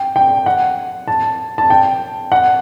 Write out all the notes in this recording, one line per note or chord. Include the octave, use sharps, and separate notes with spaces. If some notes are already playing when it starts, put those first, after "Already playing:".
Already playing: G5
G5
F#5
A5
A5
G5
F#5